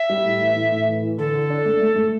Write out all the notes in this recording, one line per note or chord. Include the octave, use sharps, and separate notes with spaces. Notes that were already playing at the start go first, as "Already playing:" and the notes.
Already playing: E5
G3
A2
E3
A2
A2
E3
E3
D3 A4
D3
D4
A3
A3
A3